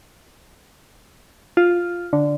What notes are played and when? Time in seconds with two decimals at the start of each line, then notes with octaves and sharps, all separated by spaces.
1.57 F4
2.13 D3